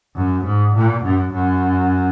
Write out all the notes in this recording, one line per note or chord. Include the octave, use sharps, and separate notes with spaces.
F#2
G#2
A#2
F#2
F#2